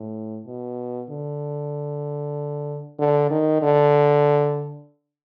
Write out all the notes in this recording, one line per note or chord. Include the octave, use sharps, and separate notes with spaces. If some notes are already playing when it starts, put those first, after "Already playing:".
Already playing: A2
B2
D3
D3
D#3
D3